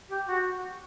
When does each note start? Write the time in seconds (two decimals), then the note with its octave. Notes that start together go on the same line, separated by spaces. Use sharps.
0.09 G4
0.27 F#4